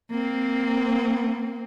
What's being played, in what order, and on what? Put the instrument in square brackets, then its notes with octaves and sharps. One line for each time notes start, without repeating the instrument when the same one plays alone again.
[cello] A#3 C4